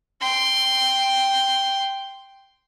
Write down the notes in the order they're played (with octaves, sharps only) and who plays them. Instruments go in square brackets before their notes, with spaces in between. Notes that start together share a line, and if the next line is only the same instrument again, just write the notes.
[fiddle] G5 C6